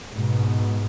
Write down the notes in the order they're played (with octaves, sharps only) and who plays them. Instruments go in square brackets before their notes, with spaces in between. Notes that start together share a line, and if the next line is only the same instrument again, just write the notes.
[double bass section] G#2 B2